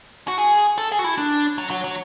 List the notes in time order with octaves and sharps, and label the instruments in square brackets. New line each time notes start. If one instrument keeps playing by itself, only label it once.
[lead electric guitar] F#4
G#4
A4
G#4
F#4
E4
D4
F#3
F#3
F#3